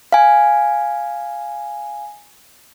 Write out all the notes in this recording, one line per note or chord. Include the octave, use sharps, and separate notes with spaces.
F5 G#5